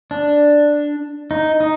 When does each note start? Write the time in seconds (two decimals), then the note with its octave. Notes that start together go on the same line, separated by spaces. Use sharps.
0.11 D4
1.31 D#4
1.60 D#4